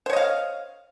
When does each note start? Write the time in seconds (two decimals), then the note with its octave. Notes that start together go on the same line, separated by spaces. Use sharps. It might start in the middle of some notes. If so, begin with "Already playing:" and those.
0.06 C5
0.10 C#5
0.13 D#5
0.16 F5